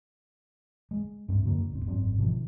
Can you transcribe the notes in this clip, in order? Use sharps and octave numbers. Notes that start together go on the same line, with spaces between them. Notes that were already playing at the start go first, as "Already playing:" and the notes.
G#3
G2 C4
F#2 D3 A#3
D1 C4
G#1 F#2 C4
B2 D#3 F3